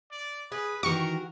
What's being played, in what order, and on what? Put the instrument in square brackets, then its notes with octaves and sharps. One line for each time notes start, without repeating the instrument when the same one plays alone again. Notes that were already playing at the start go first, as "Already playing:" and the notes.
[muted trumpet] D5
[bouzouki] G#4 [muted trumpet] B4
[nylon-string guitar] D#3 E3 G4 [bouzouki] F#4 [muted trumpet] A#4 [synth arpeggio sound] C#6